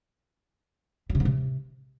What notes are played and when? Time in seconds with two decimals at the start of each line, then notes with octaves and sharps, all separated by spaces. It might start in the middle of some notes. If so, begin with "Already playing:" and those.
1.10 F#3
1.15 C3
1.20 G#2
1.25 C3